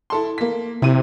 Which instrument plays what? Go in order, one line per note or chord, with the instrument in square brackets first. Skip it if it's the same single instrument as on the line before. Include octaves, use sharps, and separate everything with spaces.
[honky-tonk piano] E4 A4 C6
A#3 B6
[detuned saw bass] C3 [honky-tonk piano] E4 D#7